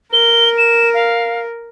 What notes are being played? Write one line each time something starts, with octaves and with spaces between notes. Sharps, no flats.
A#4 G7
E7
F5